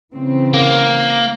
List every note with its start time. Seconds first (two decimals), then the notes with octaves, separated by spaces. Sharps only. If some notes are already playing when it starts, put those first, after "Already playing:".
0.14 C#3 E3 C4
0.54 A#3